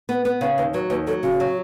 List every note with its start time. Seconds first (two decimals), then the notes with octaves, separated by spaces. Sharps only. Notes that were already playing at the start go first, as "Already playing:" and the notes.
0.09 B3 B4
0.25 B3 B4
0.41 C#3 B4
0.58 D#2 B4
0.74 F#3 B4
0.90 D#2 B4
1.07 F#3 A4
1.23 C#3 F#4
1.40 F#3